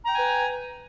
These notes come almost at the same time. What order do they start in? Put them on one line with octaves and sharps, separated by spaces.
A#5 G5 G#5 B4